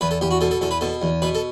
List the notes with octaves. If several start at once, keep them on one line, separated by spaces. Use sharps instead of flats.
E2 B4
A4
E2 G4
F#4
B2 A4
A4
E2 A4
B4
B2 A4
E2
B2 B4
A4